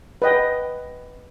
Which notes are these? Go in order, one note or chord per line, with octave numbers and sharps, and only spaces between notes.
B4 D#5 G5